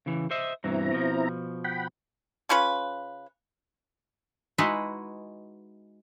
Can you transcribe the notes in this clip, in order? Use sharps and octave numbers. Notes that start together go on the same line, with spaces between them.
C#3 E3
C5 D#5 E5
G2 B2 E3 C4 E4 A#5
B2 F3
F#5 G5 B5
C#3 C#4 F4 B4
G#3 D#4 E4 F#4 G#4 B4